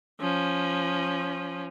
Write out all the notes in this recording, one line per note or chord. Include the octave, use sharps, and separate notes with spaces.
F3 C#4